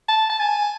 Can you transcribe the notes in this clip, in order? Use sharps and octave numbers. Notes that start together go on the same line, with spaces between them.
A5
A5
G#5